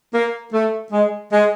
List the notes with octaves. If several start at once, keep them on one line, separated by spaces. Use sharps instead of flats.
A#3
A3
G#3
G#3